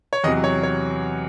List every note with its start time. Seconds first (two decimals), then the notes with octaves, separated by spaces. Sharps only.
0.13 C#5
0.24 E2 C3 F#3 D#5
0.44 C#5
0.63 C#5